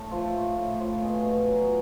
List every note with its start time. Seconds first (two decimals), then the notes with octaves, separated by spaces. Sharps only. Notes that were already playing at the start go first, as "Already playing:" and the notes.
Already playing: A2 A4
0.11 F3
0.35 A2
0.57 A2
0.80 F3
1.02 B2 G#4
1.25 B2
1.48 F#3